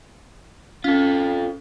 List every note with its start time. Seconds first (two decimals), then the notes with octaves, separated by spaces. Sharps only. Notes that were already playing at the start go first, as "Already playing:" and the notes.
0.84 C#4 F4 A4